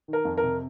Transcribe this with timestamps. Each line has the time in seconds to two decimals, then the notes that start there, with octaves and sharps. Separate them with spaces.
0.08 D#3
0.13 A#4
0.25 F2
0.38 A#4
0.43 C3